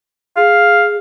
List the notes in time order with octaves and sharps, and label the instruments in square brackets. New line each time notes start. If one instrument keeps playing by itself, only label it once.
[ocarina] G#4 [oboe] F5